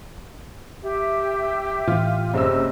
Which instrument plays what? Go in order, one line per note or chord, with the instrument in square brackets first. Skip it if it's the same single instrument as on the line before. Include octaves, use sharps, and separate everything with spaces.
[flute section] G4 E5
[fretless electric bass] A2 E3 [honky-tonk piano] F4
[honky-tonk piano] F#1 E6 [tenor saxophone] C3